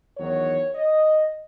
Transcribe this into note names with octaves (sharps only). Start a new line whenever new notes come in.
E2 D#3 F#3 C#5
D#5